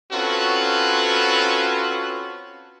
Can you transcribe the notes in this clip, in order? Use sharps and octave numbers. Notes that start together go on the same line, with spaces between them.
C4 C#4 F4 F#4 A4 B4